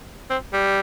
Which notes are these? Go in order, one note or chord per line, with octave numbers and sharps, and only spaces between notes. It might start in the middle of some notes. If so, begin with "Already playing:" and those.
C4
G3